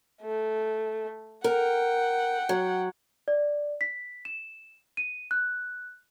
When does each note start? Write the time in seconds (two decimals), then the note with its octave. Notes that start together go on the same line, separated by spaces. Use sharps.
0.22 A3
1.44 A#4 F#5 G5
2.49 F#3
3.28 D5
3.81 B6
4.25 E7
4.97 D#7
5.31 F#6